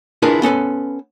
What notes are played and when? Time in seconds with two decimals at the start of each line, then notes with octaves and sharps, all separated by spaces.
0.22 D4 E4 F4 G#4 A#4 B4
0.42 B3 C#4 A4 B4